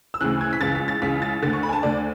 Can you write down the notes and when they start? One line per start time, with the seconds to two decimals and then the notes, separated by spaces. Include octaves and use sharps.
0.14 E6
0.21 D2 C#3 E3 F#6
0.41 G#6
0.53 B6
0.61 C#2 C#3 E3 A6
0.75 B6
0.88 A6
1.02 C#2 C#3 E3 B6
1.22 A6
1.42 D3 A6
1.46 D2
1.53 C#6
1.63 B5
1.69 G#5
1.73 A5
1.83 D2 D3 D5